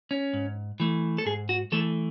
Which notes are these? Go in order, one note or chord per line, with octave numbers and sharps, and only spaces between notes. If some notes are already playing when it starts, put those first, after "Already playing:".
C#4
G#2
E3 A3
A4
G#2 G#4
F#4
E3 A3 A4